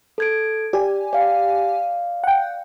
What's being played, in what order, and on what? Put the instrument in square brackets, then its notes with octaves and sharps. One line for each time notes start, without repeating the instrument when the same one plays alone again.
[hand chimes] A4 G#6 D7
[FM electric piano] G4 G#5 [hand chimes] D5
[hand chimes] D5 F5
[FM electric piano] F#5 G5